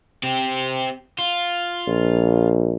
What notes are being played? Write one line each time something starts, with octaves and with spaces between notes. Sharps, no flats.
C4 G4
F4
A#1